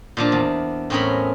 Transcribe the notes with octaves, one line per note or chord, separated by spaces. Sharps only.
A#2 F3 D4
E2
A2 C4 C#4 G#4 A#4 B5